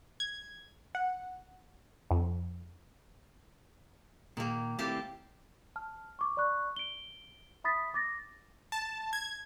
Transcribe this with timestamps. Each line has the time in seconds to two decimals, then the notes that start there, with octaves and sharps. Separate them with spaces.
0.20 G#6
0.95 F#5
2.11 F2
4.37 A#2 D#3 A#3
4.79 A3 C4 E4 G4 F5 A5
5.76 A5 F6
6.19 C#6 D6
6.37 D5 B5 C#6 F#6
6.76 D7 G7
7.64 E5 B5 D#6 A6 B6
7.94 D6 A6 A#6
8.72 A5
9.13 G#6